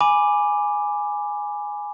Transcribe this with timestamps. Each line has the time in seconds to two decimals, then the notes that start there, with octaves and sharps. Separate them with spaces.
0.01 G#5 B5 D6